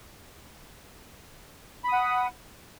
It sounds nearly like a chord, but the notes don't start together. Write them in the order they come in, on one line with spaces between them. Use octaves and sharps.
B5 D#6 F#5